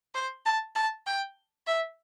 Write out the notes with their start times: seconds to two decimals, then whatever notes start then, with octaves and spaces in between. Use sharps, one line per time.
0.15 C5
0.45 A5
0.75 A5
1.06 G5
1.67 E5